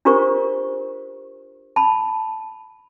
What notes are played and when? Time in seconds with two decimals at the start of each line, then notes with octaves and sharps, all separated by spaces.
0.05 D4 F4 G4 A#4 C5 C#6
1.76 A5 B5